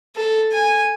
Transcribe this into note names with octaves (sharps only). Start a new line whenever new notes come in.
A4
G#5